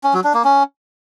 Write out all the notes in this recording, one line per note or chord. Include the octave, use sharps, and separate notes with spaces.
C#4
F#3
D4
A#3
C#4